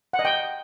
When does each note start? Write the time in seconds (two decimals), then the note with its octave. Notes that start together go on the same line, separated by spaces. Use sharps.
0.13 F#5
0.19 D#5
0.25 G5